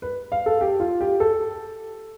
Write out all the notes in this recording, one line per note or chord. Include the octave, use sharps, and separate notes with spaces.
B4
F5
A4
G4
F4
G4
A4